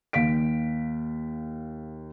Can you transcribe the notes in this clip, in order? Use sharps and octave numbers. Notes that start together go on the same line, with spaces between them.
D#2 F5 B6 D7